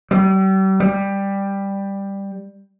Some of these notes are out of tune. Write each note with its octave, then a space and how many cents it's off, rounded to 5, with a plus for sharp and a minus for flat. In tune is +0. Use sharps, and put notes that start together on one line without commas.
G3 -40
G3 +10